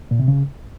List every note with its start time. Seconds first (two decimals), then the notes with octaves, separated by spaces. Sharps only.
0.11 A#2
0.19 C3
0.28 C#3